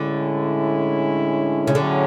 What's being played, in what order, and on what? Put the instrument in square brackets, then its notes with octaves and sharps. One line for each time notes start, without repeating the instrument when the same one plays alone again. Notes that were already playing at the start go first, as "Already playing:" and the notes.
Already playing: [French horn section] A2 G#3 C#4 E4 [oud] D3
[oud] C#3
[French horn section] A2 F#3 C#4 G#4 [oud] D3